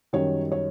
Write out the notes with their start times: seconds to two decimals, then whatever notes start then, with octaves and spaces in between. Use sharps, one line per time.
0.13 F#2 D#3 G3 C#5
0.52 C#5